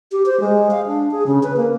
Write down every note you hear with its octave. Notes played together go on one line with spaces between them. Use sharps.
G4
C5
G#3
F5
D4
G#4
C#3
B4
A#3